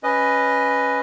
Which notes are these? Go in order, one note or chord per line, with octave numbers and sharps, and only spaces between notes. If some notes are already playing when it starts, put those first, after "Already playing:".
C#4 B4 D#5